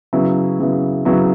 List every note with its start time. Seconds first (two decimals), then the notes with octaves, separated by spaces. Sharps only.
0.13 C#3 F#3 B3 E4
0.59 C#3 F#3 B3 E4
1.05 C#3 F#3 B3 E4